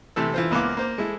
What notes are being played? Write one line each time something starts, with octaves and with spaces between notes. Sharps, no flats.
C3 E3 A3 A4
E3 F4 C5
C#2 A#3 B3 E4 F5 D6
A#3 C5
G#3 E4 A4